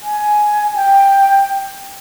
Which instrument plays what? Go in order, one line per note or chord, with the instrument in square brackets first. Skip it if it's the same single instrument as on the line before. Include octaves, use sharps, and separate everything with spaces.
[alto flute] G#5
G5